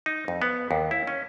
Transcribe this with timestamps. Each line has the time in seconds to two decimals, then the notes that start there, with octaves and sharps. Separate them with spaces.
0.06 D#4
0.28 F2
0.42 B3
0.71 D#2
0.91 E4
1.07 C#4